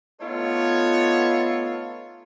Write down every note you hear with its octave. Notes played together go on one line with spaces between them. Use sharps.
A3 B3 D#4 F4 A4 C#5